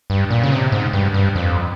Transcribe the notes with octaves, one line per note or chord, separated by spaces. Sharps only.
G2
A#2
C#3
C3
G#2
G2
G2
F2